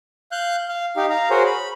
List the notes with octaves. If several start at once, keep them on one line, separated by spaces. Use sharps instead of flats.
F5 F#6 G6
F5
D#4 G4 F5
F5 A#5
F#4 G#4 A#4 C5 C#5
B5